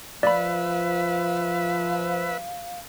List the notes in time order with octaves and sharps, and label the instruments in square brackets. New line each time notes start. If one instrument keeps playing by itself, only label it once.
[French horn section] F3 [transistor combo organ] B4 E5 [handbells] D5 B5 [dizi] F5